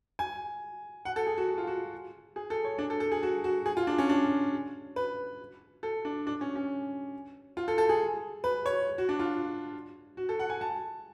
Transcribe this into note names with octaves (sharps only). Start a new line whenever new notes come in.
G#5
F#5
A4
G#4
F#4
F#4
F4
F#4
G#4
A4
C#5
D4
A4
A4
G#4
F#4
F#4
G#4
F4
D4
C#4
D4
B4
A4
D4
D4
C#4
C#4
F4
A4
A4
G#4
B4
C#5
F#4
D4
F4
F#4
A4
F#5
G#5
A5